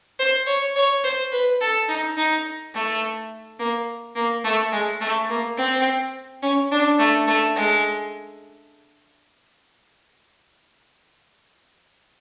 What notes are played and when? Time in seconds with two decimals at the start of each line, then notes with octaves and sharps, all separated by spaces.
0.19 C5
0.47 C#5
0.76 C#5
1.04 C5
1.32 B4
1.61 A4
1.88 D#4
2.17 D#4
2.74 A3
3.59 A#3
4.16 A#3
4.44 A3
4.72 G#3
5.00 A3
5.29 A#3
5.57 C4
6.42 C#4
6.71 D4
6.99 A3
7.27 A3
7.56 G#3